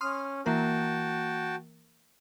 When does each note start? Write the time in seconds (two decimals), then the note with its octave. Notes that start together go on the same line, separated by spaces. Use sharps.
0.01 C#4 C6 D#6 F6
0.46 E3 A#3 F#4 A#4 G5 A5